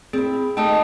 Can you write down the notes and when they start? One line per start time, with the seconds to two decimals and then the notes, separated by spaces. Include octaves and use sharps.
0.13 C4 E4 G#4
0.57 A3 D#4 G4 A4 G5 A5 D#6